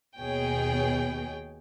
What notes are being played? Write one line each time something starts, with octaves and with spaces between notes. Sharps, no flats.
D#2 B2 G#4 C#5 G5